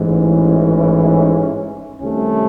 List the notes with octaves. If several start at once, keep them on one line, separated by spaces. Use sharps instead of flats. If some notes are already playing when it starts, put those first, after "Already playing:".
Already playing: A1 G#2 E3
C#4
C2 C3 D#3 A3 C#4